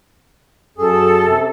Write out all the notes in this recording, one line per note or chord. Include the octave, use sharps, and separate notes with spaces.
F#2 G#4 A4
C3